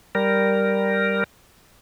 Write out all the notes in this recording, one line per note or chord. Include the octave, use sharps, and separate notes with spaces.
G3 A#4